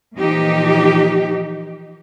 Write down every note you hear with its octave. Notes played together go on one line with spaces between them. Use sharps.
A#2 E3 F3 D#4 G4